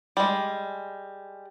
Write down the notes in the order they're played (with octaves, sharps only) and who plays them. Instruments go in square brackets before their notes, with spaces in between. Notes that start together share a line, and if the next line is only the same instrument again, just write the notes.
[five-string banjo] G3 G#3